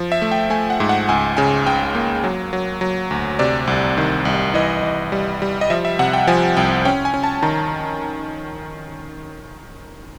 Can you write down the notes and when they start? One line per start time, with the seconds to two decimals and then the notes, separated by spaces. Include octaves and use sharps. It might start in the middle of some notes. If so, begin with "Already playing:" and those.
Already playing: F3
0.12 E5
0.22 A3
0.31 G5
0.50 A3 G#5
0.70 F#5
0.80 G#2
0.89 F#5
1.09 C#2 G#5
1.37 C#3 G#5
1.67 C#2 G5
1.95 A#3
2.24 F#3
2.53 F#3
2.81 F#3
3.11 D2
3.39 C3 D5
3.67 C2
3.97 D#3
4.25 C2
4.54 E3 D#5
4.83 E3
5.12 G3
5.42 G3
5.61 D#5
5.70 F3 E5
5.85 E5
5.99 C3 F#5
6.13 G5
6.27 F3 G#5
6.57 C2 G5
6.85 C#4 G5
7.05 G#5
7.14 C#4
7.23 A5
7.42 D#3 A#5